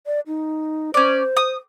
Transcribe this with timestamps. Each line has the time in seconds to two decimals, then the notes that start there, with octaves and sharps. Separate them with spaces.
0.06 D5
0.27 D#4
0.94 C#4 C5 D5
1.37 D#6